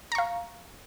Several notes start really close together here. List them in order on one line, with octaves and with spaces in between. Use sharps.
A#5 C#6 F5